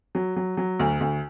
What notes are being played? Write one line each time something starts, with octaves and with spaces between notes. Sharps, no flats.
F#3
F#3
F#3
D2
D2